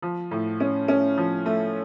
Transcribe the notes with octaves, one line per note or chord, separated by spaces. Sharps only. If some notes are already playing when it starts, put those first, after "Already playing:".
F3
A2
C#4
C#4
F3
A3